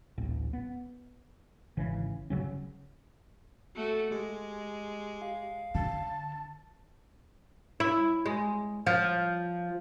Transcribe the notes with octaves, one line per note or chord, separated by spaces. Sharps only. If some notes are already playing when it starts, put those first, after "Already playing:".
D1 A1
B3
G#1 C#3 E3
G1 C#3 F#3 C#4
A3 F#4 A4
G#3 G4
F5
D3 A5
E4
G#3
F3